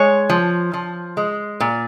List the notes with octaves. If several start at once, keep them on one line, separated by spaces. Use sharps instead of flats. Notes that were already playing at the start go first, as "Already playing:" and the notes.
Already playing: G#3 C#5
F3
F3
G#3
A#2